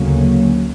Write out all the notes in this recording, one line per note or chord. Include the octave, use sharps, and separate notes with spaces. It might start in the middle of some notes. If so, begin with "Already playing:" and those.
Already playing: D2 C#3 F#3 A#3 C#4